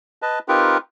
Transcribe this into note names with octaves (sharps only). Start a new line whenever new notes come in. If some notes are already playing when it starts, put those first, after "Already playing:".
B4 D#5 A5
C4 D#4 F4 G4 A#4 B4